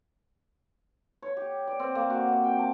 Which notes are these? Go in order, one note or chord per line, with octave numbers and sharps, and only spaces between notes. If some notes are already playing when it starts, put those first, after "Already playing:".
C#5
G4
D5
C4
A#3
F#4
C3
G5
A5